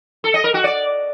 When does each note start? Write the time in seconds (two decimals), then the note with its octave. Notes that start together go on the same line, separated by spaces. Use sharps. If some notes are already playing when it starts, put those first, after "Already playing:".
0.24 A4
0.34 D#5
0.44 A#4
0.54 F#4
0.64 D5